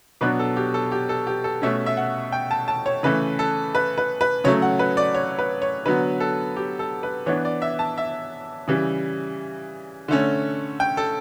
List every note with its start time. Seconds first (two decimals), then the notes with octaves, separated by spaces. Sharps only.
0.21 B2 F#3 B3 D4 B4
0.39 A4
0.56 G4
0.74 A4
0.92 G4
1.09 A4
1.27 G4
1.44 A4
1.62 B2 A3 C#4 E5
1.86 E5
1.97 F#5
2.32 G5
2.51 A5
2.68 A5
2.86 C#5
3.03 C#3 E3 A3 B4
3.39 A4
3.75 B4
3.98 B4
4.21 B4
4.44 C#3 F#3 A3 C#5
4.62 F#5
4.79 B4
4.97 D5
5.15 C#5
5.39 B4
5.62 C#5
5.85 D3 F#3 B3 B4
6.20 A4
6.56 G4
6.79 A4
7.03 B4
7.26 E3 B3 D4 C#5
7.45 D5
7.62 E5
7.79 A5
7.97 E5
8.68 C#3 E3 G3
10.08 D3 A3 C#4
10.80 G5
10.97 A4